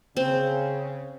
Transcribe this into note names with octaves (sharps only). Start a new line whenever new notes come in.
C#3 C4